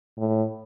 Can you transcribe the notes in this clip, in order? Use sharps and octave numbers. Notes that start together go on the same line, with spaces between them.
A2